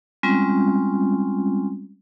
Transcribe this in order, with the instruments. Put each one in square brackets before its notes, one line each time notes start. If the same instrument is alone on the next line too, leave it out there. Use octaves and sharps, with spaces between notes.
[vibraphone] G3 G#3 C4 C#4 F4